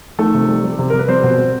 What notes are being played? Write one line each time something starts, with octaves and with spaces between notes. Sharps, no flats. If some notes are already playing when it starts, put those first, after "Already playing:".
D#3 A3 A4
C3
G3
G3
C3
C3 A#4
B4
G3 C4 C5
B2
G3